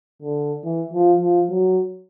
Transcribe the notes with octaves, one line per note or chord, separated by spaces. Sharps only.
D3
E3
F3
F3
F#3